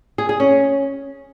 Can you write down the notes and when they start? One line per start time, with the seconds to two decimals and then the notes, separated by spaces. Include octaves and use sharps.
0.18 G#4
0.29 G#4
0.40 C#4